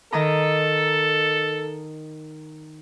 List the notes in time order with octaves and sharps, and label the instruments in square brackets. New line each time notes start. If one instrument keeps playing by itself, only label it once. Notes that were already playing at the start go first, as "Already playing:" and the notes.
[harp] D#3 D#5 A#5 [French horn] A4